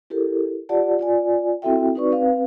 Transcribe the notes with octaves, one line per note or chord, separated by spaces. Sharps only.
E4 G4 A4 A#4
F4 G4 D5 F#5 A5
F4 D5 G#5
C4 E4 F#4 A4 E5 G5
C4 D#4 F#4 B4 D5 C#6
C4 B4 F5